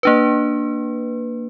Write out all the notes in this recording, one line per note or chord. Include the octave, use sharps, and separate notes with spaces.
A#3 D4 B4